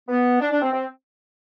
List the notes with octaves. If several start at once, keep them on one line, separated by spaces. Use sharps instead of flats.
B3
D4
D4
C4
C4